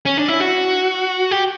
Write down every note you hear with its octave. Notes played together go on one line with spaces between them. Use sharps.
C#4
D4
E4
F#4
G4